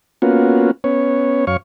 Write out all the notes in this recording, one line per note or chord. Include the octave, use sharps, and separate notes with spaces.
A#3 B3 C#4 F4 F#4
B3 C#4 C#5
F#2 C#5 F5 C#6